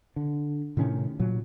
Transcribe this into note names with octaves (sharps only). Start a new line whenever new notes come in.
D3
A2 C3 D#3 C#4
A#2 F#3